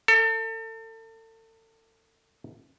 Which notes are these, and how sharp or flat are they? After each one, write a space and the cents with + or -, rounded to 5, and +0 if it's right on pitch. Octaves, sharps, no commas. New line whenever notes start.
A4 +35